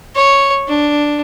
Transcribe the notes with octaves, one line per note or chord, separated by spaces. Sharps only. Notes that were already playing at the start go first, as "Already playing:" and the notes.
C#5
D4